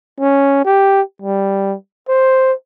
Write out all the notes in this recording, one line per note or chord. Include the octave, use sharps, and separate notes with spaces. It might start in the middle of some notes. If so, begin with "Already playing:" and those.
C#4
G4
G3
C5